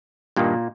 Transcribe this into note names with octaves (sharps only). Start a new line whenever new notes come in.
G2 A#2 D#3 A#3